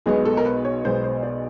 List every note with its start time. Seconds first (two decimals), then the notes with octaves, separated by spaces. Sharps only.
0.06 B1 B2 G#3 B3 G#4
0.25 A4
0.37 A#4
0.45 B4
0.65 C#5
0.84 B1 B2 G#3 B3 C5
1.04 C5
1.23 D5